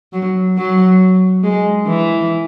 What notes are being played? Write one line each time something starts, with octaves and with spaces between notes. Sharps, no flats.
F#3
F#3
G#3
E3